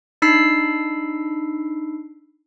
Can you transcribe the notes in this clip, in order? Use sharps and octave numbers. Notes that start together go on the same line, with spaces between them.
D4 D#4 B5 E6 B6 C7